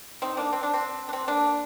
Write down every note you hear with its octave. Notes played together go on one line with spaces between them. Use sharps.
C4 D#4
A#3 D4
C4
D4
C4
D4
C4
A#3 D4